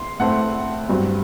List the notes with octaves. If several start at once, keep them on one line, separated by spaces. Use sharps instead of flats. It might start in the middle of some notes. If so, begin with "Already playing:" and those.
Already playing: C6
A2 A3 C4 F#5
G2 F#3 C4